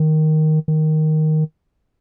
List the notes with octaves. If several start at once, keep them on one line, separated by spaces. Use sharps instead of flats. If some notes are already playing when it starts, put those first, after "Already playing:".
Already playing: D#3
D#3